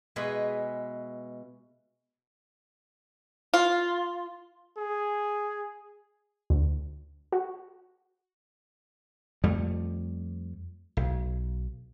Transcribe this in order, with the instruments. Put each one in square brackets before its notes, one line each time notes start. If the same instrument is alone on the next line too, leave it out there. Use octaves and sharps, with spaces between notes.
[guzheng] B2 G#3 E4 B4 G#5
[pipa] F4
[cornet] G#4
[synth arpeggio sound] D2
F#4
[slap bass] F2 G3 A3
B1